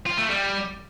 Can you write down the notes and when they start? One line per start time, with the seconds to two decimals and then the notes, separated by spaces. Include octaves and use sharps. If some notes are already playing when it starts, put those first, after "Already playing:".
0.06 F4
0.18 A3
0.30 G3